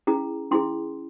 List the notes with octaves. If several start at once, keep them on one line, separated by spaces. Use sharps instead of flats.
C#4 E4 G#4 A#5
C#4 E4 G#4 C6